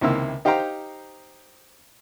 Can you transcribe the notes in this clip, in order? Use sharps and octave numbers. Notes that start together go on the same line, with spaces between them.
C#2 C3 D#3 A#3 E4 E6
D#4 G4 C5 F5 G5 A#5